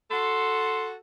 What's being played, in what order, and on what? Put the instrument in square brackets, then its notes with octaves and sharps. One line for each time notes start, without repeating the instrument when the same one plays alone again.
[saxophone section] F#4 A4 [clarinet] C6